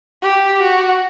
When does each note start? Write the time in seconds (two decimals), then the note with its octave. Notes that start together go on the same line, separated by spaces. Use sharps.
0.22 G4
0.62 F#4